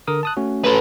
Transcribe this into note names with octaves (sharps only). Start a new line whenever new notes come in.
D3 A#4 D#6
A5 D#6 F#6
A3 C#4 F#4
A4 B4